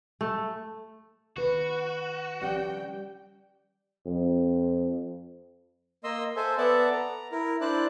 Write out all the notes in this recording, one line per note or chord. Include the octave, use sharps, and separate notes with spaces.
A3
D#3 F#4 B4
F3 G3 C#4 D5 G5
F2
A#3 D#5 C6 E6
A4 C5 E5 G#5
B3 A4 D5 E5 F#5 A5
A#5
E4 A#4
D4 E4 C5 D5 A5 F#6